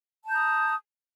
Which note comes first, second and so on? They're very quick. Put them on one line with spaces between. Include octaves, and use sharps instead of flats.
A5 G6 A#5 D#6